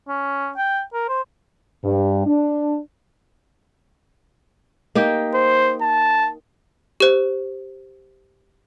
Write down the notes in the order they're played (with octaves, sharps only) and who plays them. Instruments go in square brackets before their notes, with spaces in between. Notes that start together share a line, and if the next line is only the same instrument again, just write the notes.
[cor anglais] C#4
G5
A#4
C5
[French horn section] G2
D4
[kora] A#3 D#4 G4
[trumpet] C5
A5
[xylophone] G4 C5